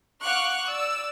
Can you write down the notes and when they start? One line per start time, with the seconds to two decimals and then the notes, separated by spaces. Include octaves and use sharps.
0.23 F5 F#5 C#6 D6 F6 F#6
0.67 D5 E6